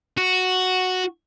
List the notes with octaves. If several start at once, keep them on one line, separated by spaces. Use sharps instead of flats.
F#4